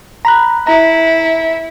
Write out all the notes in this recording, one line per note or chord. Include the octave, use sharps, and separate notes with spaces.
A#5 B5 F#6
E4 A#5